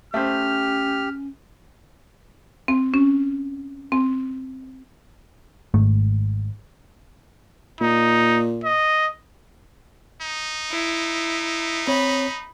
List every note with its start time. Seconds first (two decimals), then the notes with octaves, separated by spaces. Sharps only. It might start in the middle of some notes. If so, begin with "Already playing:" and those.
0.14 A3 C#4 G4 C5 F6
2.68 C4
2.94 C#4
3.92 C4
5.74 G#1 G#2 A3
7.81 A#2 D#4
8.64 D#5
10.22 D#4
10.71 E4
11.88 C4 C#5 B5